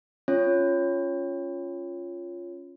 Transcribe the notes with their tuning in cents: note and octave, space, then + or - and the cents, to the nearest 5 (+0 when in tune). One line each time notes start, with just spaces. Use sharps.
C#4 +0 F4 +0 C#5 +0